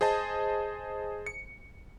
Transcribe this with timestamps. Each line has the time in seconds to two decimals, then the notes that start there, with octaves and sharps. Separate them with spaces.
0.01 G#4 C5 D#5 A5
1.26 C#7